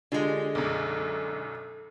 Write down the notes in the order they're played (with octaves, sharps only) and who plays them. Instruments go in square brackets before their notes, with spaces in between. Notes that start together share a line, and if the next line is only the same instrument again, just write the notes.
[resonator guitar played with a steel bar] D3 G#3 [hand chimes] D4 F4 G4
[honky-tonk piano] B1 F#2 [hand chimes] A4